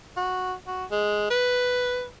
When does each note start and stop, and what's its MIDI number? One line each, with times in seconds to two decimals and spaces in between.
0.17 0.54 66
0.67 0.85 66
0.91 1.30 56
1.30 2.06 71